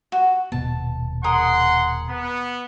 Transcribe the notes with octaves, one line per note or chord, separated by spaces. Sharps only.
F#4
D#1 B2 B3 A5
G#4 A#4 F#5 C6 D#6
B3